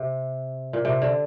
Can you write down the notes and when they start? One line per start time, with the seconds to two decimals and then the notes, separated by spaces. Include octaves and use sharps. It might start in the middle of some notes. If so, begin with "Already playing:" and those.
Already playing: C3
0.73 A#2
0.85 C3
1.02 D3